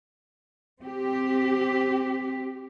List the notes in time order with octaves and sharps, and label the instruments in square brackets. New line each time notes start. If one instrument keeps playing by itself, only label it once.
[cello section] C4 G4